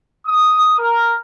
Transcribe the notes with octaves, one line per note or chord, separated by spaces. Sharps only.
D#6
A#4